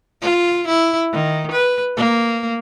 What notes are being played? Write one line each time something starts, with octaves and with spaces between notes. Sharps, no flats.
F4
E4
D#3
B4
A#3